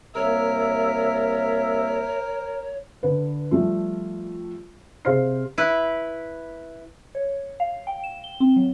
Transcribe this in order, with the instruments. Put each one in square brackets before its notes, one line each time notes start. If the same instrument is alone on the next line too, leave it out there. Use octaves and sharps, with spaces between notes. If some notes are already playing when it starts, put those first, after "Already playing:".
[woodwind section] C2 A#3 E5 [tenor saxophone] A#4 [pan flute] C#5
[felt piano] D3 B4
F3 G3 A3 F4
C3 G#4 C5 F5 F6 C7
[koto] E4 B4
[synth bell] C#5
F5
G5
E7
G7
C4
F#3